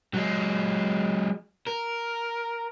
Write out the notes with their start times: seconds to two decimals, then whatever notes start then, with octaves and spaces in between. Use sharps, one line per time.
0.14 F#3 G#3
1.67 A#4